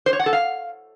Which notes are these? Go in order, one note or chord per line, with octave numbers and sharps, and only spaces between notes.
C5
C#5
F#5
A4
F5